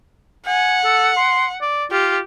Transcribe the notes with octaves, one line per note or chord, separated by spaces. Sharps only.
F#5 G#5
A4
C6
D5
F4 G4